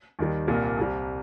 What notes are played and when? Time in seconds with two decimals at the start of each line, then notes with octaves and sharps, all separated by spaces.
0.19 D#2 D#3 G3
0.47 C2 A#2 G3 A#3
0.77 C2 C3 G3